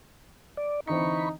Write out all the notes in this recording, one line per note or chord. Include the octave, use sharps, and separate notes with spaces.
D5
D3 E3 C4 D#4 B5 C#6